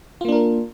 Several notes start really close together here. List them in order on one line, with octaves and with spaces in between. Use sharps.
F4 A#3 D4 A#4